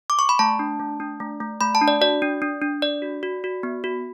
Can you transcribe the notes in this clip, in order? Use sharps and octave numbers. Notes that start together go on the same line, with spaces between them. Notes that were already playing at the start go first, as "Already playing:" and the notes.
D6
C#6
B5
A3 A5
D4
A3
D4
A3
A3
A3 B5
A5
D4
D5
F#4 D5
D4
D4
D4
D4 D5
F#4
F#4
F#4
B3
F#4